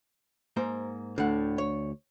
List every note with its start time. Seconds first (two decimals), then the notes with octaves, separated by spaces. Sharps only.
0.57 G#2 A#3 C5
1.18 D2 A2 D3 F#5
1.58 C#5